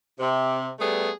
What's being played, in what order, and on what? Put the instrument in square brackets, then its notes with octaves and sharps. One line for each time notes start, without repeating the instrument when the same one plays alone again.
[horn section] C3
G3 A3 B3 G#4